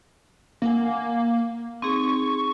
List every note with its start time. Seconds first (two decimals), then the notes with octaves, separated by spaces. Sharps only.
0.62 A#3 A#4 F#5 G#5
1.82 C4 D#4 G#4 C#6